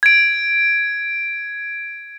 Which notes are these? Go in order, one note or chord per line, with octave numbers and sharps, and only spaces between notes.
G#6 D7